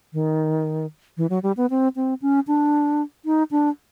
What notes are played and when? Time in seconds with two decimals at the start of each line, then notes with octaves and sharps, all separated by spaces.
0.13 D#3
1.17 E3
1.30 F#3
1.43 G3
1.57 B3
1.70 C4
1.96 C4
2.22 C#4
2.47 D4
3.25 D#4
3.51 D4